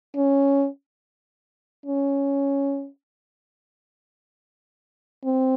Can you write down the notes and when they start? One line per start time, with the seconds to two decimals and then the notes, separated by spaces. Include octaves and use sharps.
0.16 C#4
1.86 C#4
5.24 C4